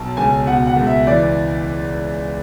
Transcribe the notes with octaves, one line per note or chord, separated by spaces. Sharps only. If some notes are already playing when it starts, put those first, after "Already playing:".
Already playing: B1 B2 A5
C#2 G#5
B2 F#5
F#5
C#2
E5
E3 D5